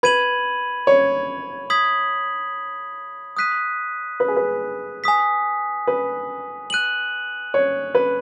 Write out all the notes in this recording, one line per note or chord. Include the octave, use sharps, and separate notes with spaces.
B4 B5 G#6 D#7 F#7
C#5
D#6 G#6 B6 F#7
D#6 F#6 B6 D#7
B4
G#4
B4
G#5 D#6 B6
B4
F#6 D#7 F#7
C#5
B4